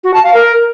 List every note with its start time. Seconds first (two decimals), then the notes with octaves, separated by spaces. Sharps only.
0.04 F#4
0.14 A5
0.24 F5
0.34 A#4